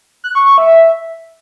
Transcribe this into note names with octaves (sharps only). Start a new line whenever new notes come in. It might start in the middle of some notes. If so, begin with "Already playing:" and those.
F#6
C#6
C#6
E5